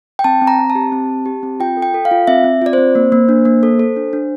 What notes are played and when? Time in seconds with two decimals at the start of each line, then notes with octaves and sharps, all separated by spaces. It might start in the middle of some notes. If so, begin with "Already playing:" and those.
0.19 G5
0.24 C4 A5
0.42 C4
0.47 A#5
0.59 C4
0.70 A5
0.75 G4
0.92 C4
1.10 G4
1.26 G4
1.43 C4
1.60 F4 G5
1.77 A4
1.82 G5
1.94 A4
2.05 F5
2.11 F4
2.27 C4 E5
2.44 C4
2.62 F4 D5
2.73 C4 C5
2.95 A#3
3.12 A#3
3.29 D4
3.45 A#3
3.63 A4
3.79 A4
3.96 D4
4.13 D4